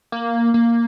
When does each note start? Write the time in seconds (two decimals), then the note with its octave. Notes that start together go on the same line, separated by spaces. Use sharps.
0.12 A#3
0.54 A#3